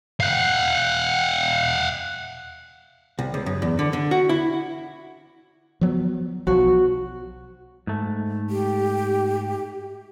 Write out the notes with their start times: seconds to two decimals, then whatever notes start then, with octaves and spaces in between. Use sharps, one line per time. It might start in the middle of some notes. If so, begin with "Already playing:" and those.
0.20 F5 F#5
3.19 C2
3.34 C#2
3.46 F#2
3.62 E2
3.79 D3
3.93 D3
4.11 F#4
4.29 E4
5.81 F3 F#3 B3
6.47 B1 F3 F#3 F#4
7.87 G#2 A3
8.50 G4